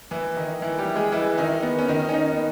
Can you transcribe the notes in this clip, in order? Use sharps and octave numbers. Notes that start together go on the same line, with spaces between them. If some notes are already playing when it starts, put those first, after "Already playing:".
E3 E4
D#3 D#4
E3 E4
G3 G4
G#3 G#4
E3 E4
D#3 D#4
B3
C#4
D#3 D#4
C#4
D#3 D#4
B3